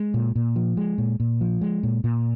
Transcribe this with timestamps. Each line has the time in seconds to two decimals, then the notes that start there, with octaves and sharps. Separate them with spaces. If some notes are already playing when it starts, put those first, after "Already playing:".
Already playing: G#3
0.14 A#2
0.36 A#2
0.56 F3
0.77 G#3
0.98 A#2
1.20 A#2
1.41 F3
1.61 G#3
1.83 A#2
2.04 A#2